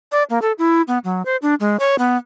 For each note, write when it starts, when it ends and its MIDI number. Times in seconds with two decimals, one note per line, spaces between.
0.12 0.23 74
0.30 0.39 58
0.42 0.52 69
0.58 0.82 64
0.88 0.98 59
1.04 1.22 54
1.25 1.36 72
1.42 1.54 62
1.60 1.77 56
1.80 1.96 73
1.99 2.17 59